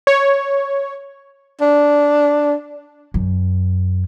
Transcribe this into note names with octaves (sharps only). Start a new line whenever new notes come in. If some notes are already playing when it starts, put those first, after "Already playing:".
C#5
D4
F#2